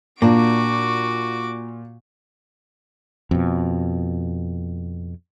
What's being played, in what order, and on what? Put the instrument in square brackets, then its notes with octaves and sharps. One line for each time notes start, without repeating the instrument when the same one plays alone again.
[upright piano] A#2 [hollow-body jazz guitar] A#3 D4 [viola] F#4 D6
[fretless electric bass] F2 B2